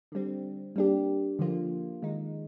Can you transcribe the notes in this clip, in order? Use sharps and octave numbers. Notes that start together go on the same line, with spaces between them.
D3 G3 C4
G3 A#3 D4 G4
D3 F3 A#3 F4
D#3 G#3 D#4